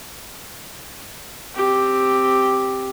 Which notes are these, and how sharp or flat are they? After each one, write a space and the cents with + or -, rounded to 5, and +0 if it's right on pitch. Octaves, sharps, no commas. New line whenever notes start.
C4 +0 G4 +0